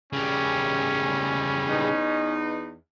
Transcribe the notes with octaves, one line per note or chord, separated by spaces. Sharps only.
C#3 G3 C#4
E2 B3 D#4